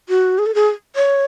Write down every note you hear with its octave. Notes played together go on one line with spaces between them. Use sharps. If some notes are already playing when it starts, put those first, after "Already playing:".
F#4
G#4
A4
G#4
C#5